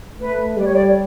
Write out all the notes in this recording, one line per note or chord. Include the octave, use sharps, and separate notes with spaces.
A3 B4
G3 D5
C#5
D5